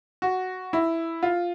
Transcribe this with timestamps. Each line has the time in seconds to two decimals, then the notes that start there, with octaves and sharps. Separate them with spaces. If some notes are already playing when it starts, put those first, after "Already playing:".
0.22 F#4
0.73 E4
1.23 F4